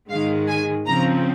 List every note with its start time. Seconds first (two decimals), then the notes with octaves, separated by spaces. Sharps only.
0.10 G#2 D#3 G#3 F5
0.47 G#5
0.86 C#3 F3 C4 A#5